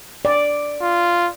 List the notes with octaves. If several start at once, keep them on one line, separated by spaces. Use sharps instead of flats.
D5
F4